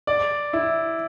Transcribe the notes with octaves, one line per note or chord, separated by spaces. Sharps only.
D5
E4